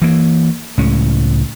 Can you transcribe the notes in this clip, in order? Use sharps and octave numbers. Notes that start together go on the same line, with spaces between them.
E3 A#3
C#2 A2 G#3 C#4